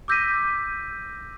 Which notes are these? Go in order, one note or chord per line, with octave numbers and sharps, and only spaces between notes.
D6 E6 G6 A#6 B6 D#7